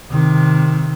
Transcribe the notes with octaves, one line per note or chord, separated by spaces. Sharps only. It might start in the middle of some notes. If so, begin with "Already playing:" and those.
C3 D#3